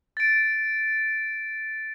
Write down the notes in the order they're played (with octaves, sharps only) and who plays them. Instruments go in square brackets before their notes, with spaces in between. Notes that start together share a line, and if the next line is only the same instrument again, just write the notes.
[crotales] A6 D7